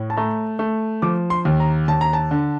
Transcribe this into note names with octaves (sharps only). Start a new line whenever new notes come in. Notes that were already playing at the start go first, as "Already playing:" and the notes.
Already playing: A2
A5
A3 A#5
A3
F3 D6
C6
D#2
A#5
D#2 A5
A#5
A5
D3